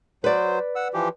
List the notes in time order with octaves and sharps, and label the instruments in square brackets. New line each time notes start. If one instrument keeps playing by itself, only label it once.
[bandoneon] F#3 C5 [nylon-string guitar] B4 D5
[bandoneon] F#5 E6
E3 F3 G4